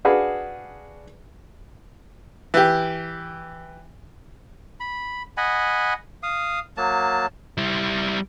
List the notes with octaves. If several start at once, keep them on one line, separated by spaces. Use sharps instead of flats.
D4 F#4 G#4 B4 F5
E3 G4
B5
D#5 F#5 G#5 B5
F5 D#6
F#3 A#3 A5
G3 E4